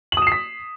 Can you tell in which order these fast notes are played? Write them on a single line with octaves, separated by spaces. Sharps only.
F#7 D#6 E7 C7 B6